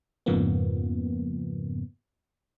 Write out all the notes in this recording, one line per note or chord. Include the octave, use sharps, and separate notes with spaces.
F2 G#2 C#3 F3 A#3 B3